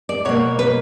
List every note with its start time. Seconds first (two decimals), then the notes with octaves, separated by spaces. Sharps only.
0.09 D5
0.25 B2 A#3 C#5
0.59 B4